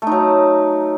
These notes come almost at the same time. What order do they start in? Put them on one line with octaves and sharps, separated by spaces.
A3 D#4 F#3